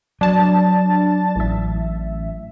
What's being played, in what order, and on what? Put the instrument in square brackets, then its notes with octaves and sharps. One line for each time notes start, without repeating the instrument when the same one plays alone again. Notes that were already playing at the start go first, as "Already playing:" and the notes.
[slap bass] F#3 [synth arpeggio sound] D4 A5 A6
[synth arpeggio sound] A1 E5